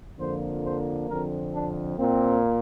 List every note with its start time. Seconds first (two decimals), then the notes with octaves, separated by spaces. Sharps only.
0.19 F2 D3 F3 A#3 C5
0.64 C5
1.09 F2 D3 F3 C4 A#4
1.54 D4
1.98 A#2 A#3 C4